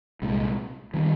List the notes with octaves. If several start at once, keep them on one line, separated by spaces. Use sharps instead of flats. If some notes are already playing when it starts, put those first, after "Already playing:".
C2 A#2 G#3
D#3 G3 C4